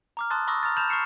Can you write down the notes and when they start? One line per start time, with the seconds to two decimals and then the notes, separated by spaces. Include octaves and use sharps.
0.17 A#5 D6 F6
0.30 A5 C6 D#6 F#6 A6
0.48 B5 C#6 D#6 E6 A#6
0.63 A#5 D#6 F6 A6
0.76 A5 B5 F6 G6 E7 F7
0.89 C#6 F6 C7 C#7 E7